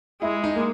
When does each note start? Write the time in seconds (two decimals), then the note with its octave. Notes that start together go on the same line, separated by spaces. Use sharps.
0.22 G#3 E4
0.44 D#4
0.56 A#3